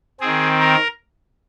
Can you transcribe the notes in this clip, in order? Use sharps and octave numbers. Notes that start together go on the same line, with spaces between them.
C4 G#4
D#3
A#4